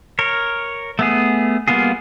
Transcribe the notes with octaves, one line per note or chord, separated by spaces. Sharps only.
A#4 C#5
A3 B3 G#4
G3 A#3 B3 F4 G#4